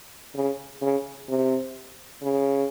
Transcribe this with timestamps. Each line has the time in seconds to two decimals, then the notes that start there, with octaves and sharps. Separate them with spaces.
0.35 C#3
0.81 C#3
1.29 C3
2.22 C#3